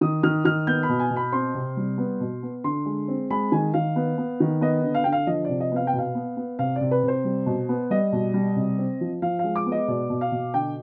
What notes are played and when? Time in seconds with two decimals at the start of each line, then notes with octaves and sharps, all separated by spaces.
0.01 D#3 D#6
0.23 D#3 F6
0.45 D#3 F6
0.67 B3 G6
0.83 B5
0.89 B2
1.00 G#5
1.10 B2
1.16 B5
1.33 C4 C6
1.55 C3
1.77 G3
1.98 B3
2.21 B2
2.43 B3
2.64 D3 C6
2.86 G#3
3.08 C4
3.30 G#3 B5
3.52 D#3 G#5
3.74 D#3 F5
3.96 B3
4.18 B3
4.40 D#3
4.61 B3 D#5
4.84 D3
4.94 F5
5.04 D3 G5
5.12 F5
5.27 F3 D#5
5.44 C3 D5
5.60 D#5
5.72 B3 F5
5.87 G5
5.93 B2
5.98 F5
6.15 B3
6.37 B3
6.59 C3 F5
6.76 D5
6.81 C3
6.91 B4
7.03 C3 C5
7.25 G3
7.46 B2
7.69 B3
7.90 G3 D#5
8.13 B2
8.34 G3
8.56 C3
8.79 C4
9.01 F3
9.22 F3 F5
9.39 G#3 F5
9.56 D6
9.66 B3
9.72 D#5
9.88 B2 D5
10.10 B2
10.21 F5
10.32 B2
10.54 D3 G5